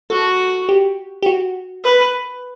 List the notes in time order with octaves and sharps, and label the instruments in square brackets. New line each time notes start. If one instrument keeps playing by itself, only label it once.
[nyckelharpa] F#4 [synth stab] A4
[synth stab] G4
G4
F#4
[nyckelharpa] B4